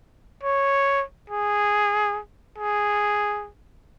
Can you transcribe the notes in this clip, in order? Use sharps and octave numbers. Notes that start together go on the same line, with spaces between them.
C#5
G#4
G#4